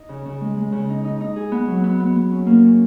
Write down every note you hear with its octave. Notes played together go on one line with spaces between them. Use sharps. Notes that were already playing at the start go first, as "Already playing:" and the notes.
Already playing: D#4
C#3
C#3
G#3
G#3
C#3
D#4
D#4
D#4
G#4
B3
F#3
B3
B3
B3
C#4
A#3
C#4